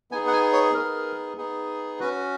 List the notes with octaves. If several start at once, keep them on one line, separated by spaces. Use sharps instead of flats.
B3 D#4 G#4 G#5
F#5
G#5
C#5
B3 D#4 G#4 A#4
B3 D#4 G#4
C#4 F#4 B4